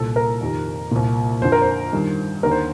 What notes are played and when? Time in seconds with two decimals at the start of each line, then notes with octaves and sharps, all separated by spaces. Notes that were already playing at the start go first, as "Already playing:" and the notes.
Already playing: C2 A#2 A4
0.16 A#4
0.41 F2 C3 D#3
0.91 C2 A#2
1.42 F2 D3 C5
1.52 A#4
1.62 C5
1.93 G2 D#3
2.43 D#2 D3 A#4
2.51 C5